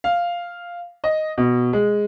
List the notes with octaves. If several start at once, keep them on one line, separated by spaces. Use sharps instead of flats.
F5
D#5
B2
G#3